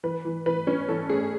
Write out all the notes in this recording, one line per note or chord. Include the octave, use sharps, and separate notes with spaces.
E3 B4
E3
E3 B4
C#4
E3 A4
A3 G#4